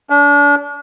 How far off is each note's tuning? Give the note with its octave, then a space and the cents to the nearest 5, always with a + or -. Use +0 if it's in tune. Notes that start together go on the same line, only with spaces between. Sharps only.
D4 -35